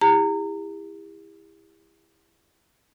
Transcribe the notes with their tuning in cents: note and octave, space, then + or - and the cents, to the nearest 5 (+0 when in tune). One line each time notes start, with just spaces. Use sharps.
E4 +0 G4 +45 A#5 -25